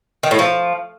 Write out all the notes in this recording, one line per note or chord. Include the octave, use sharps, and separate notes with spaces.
D#3
A2
F3